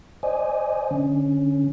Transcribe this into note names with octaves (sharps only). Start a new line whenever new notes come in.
C5 D5 D#5 G#5
D3 C#4